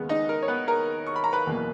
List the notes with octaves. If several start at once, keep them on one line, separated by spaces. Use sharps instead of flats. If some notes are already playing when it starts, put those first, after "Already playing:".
Already playing: D#2 C#3 G#3 B3
D#4 D#5
A#4
C#5
B3 B4
A#4 A#5
C#6
B5
A#5
B4 B5
F#1 E2 B2 A#3